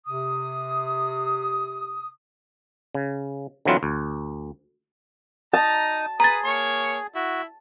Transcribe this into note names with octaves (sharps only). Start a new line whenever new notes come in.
C3 D#6
C#3
D3 E3 F#3 C4 F4 B4
D2
D#4 A5 A#5 D#6
G#4 B4 A#5 D#6 A6
A#3 C#5 C#6
E4 F#4